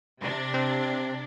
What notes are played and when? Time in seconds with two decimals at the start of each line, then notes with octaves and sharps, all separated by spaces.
0.22 C3 D4
0.54 C4